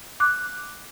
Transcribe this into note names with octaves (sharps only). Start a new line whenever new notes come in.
D6 F#6